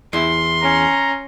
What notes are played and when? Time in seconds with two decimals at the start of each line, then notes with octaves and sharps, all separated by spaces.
0.13 E2 E4 C6
0.62 C#4 A#5